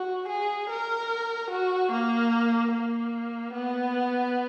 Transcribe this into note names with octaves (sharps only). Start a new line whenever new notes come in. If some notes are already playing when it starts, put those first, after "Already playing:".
Already playing: F#4
G#4
A#4
F#4
A#3
A#3
B3